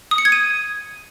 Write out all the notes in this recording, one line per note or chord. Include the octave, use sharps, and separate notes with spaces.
D#6
C#7
G#6
D#7